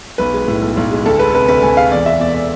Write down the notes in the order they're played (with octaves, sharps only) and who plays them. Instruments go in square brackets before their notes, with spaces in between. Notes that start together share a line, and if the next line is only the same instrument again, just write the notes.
[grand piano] B1 B4
G#3
A2
B1
B1
G#3
D2 A4
G#3 B4
C3 B4
D2 B4
D2 G#5
G#3 F5
E2 D5
G#3 E5
B2 D5
D5